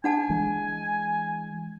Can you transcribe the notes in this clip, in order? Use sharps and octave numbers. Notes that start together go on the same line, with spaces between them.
D4 F#5 G#5 A5
E3 G#3